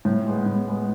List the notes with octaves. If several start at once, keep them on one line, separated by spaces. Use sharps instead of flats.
A2
G#3 B3
A2
G#3 B3